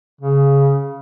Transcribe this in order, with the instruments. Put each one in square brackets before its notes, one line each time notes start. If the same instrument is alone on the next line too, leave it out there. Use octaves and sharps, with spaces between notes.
[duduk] C#3